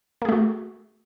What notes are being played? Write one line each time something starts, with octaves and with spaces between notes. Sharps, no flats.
A3 A#3 F#4 G#4